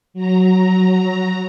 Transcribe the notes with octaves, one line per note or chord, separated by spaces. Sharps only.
F#3 A#5